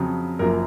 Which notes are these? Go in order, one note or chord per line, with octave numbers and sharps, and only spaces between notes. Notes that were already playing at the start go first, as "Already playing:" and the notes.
Already playing: F2 C#3 F#3
F#1 F#2 F3 A#3 A#4